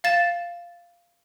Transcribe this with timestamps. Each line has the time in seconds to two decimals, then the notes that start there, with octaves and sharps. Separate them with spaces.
0.04 F5 A6 E7